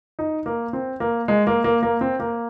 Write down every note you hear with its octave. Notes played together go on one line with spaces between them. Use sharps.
D#4
A#3
C4
A#3
G#3
A#3
A#3
A#3
C4
A#3